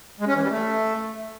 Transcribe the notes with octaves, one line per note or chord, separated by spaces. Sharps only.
G#3
C#4
E3
G3
A3